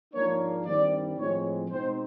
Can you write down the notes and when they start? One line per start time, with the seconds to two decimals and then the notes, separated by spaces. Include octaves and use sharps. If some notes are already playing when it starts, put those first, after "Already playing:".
0.14 G#2 F3 A#3 D4 C#5
0.66 G2 D#3 G3 C4 D5
1.18 A2 F3 G#3 C4 C#5
1.70 B2 G#3 C4 D#4 C5